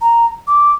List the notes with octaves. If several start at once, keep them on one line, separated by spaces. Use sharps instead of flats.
A#5
D6